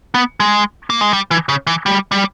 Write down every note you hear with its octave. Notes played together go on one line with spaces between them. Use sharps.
B3
G#3
A#3
G#3
G3
E3
C#3
E3
G3
G3